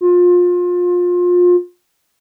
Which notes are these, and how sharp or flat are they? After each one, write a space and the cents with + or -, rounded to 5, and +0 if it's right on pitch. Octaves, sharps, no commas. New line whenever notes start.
F4 +25